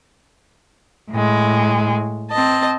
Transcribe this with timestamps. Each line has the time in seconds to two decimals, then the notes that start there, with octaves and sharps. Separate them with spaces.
1.10 A2 G#3
2.31 C4 D#5 A5